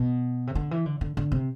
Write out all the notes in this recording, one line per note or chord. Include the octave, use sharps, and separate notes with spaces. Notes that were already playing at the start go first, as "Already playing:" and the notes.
Already playing: B2
C3
D3
E3
D3
D3
D3
C3